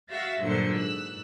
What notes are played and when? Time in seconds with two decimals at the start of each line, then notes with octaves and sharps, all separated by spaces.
0.10 F#4 E5 F5 A6 A#6
0.41 G2 A#2 D3 F#3 C5 C#7
0.75 G#2 E6 F#6